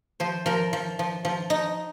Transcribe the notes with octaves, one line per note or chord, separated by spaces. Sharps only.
F3 C5
F3 A#4
F3
F3
F3
D#4